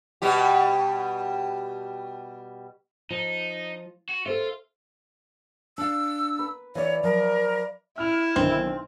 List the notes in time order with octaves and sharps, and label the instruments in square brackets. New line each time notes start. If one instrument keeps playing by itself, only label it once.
[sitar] B2 G3 G4
[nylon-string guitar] F3 [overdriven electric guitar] D#4
[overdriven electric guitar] F#4
[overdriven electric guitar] F4 [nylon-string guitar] A4 C5 E5
[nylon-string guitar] D4 F5 [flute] E6
[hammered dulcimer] B4
[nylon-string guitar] E3 [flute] C#5 [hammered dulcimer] D5 E5 F5
[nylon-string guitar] F3 F#3 [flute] A#4
[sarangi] E4 [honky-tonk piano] F6 F7
[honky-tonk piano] B1 D3 D#3 [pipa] C4